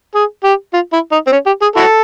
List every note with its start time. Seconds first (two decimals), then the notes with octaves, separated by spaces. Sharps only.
0.15 G#4
0.44 G4
0.74 F4
0.93 E4
1.12 D#4
1.27 C4
1.32 C#4
1.46 G4
1.62 G#4
1.76 E4 F#4 A4